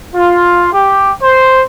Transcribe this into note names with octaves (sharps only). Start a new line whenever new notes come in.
F4
G4
C5